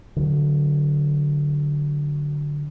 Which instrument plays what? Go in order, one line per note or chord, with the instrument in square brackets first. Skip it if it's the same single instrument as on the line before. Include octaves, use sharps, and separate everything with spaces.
[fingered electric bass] D3 F#3